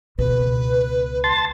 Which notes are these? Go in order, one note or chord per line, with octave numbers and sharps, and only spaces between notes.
C#2 B2 B4
A5 C6 A6